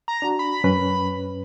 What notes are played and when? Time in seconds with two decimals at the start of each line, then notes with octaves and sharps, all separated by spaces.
0.08 A#5
0.22 D4 F#4
0.39 B5
0.64 F#2 C#4 B4